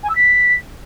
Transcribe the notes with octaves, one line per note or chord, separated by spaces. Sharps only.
G#5
E6
B6